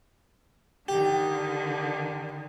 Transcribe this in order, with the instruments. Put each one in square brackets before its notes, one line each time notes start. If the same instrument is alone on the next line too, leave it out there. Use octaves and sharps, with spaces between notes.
[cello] D3 D#3 [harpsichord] G4